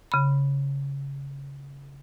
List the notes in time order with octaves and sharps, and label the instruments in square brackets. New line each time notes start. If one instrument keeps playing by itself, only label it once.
[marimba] C#3 B5